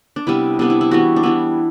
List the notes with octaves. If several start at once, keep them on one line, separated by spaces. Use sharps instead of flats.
D4
C3 G3 B3 E4
C3 G3 B3 D4
E4
E4
E3 G3 B3 F#4
D4
E3 G3 B3 E4